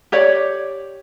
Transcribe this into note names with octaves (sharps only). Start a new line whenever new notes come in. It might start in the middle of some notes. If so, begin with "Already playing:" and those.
G4 C#5 D5